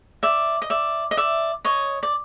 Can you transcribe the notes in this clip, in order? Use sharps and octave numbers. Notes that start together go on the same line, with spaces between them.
D5 E5
D#5
D5 E5
D#5
D5 E5
C#5 D#5
D5